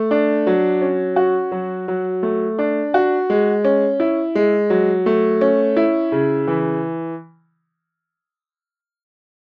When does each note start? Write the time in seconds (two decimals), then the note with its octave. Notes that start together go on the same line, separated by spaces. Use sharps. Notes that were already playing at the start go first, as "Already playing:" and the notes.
Already playing: A3
0.11 D4
0.47 F#3
0.82 C#4
1.16 F#4
1.52 F#3
1.88 F#3
2.23 A3
2.59 D4
2.94 F#4
3.30 G#3
3.65 C#4
4.00 E4
4.35 G#3
4.70 F#3
5.06 A3
5.41 C#4
5.77 E4
6.12 C#3
6.47 E3